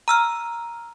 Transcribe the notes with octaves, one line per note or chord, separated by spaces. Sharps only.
A#5 E6 F6